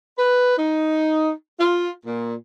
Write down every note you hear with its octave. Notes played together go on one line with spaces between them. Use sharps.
B4
D#4
F4
A#2